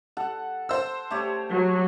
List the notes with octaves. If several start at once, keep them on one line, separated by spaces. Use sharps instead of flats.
A4 F#5
C5 E6
A3 G4 C#5
F#3